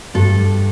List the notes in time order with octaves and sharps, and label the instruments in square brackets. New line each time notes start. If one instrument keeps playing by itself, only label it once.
[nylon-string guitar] G2 A4